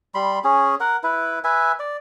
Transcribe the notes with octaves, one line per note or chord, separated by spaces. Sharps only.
G3 B5 C6
C#4 G#4
A#4 F#5
E4 B4
B4 E5 G#5
D5